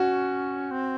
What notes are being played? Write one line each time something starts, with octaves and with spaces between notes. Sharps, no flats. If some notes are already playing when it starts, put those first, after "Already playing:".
Already playing: C#4 F#4
C4